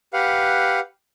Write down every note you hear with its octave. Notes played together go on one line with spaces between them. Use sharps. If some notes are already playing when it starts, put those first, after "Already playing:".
G4 B4 F5 F#5